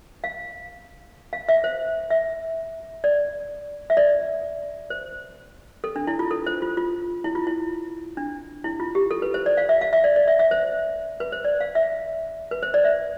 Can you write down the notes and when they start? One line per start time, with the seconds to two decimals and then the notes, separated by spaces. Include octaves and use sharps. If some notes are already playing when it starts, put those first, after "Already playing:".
0.24 F5
1.33 F5
1.49 E5
1.64 C5
2.10 E5
3.04 D5
3.90 E5
3.97 D5
4.90 C5
5.84 A4
5.96 D4
6.07 E4
6.19 F4
6.31 A4
6.46 C5
6.62 F4
6.77 F4
7.24 E4
7.35 F4
7.47 E4
8.17 D4
8.64 E4
8.80 F4
8.95 G4
9.11 A4
9.22 B4
9.34 C5
9.46 D5
9.57 F5
9.69 E5
9.81 F5
9.93 E5
10.04 D5
10.16 D5
10.28 E5
10.39 E5
10.51 C5
11.20 B4
11.32 C5
11.45 D5
11.60 F5
11.75 E5
12.51 B4
12.63 C5
12.74 D5
12.84 E5